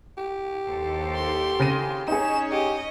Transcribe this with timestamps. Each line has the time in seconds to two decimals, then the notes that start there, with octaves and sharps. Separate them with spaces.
0.17 G4
0.68 D#2 A4 C5
1.15 C6
1.59 C#3 A#6 D#7
2.08 C#4 D#4 G#4 C#5 E7
2.52 G4 D#5